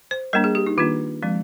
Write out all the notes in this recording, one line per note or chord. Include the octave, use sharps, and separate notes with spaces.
C5
G3 A#3 D4 A#4
G#4
G4
D#4
D#3 A#3 D4 F4
F3 G#3 C4